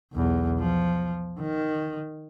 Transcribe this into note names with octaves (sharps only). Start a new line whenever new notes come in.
B1 E2
F3
D#3